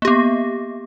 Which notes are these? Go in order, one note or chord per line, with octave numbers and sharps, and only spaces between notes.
A#3 B3 G4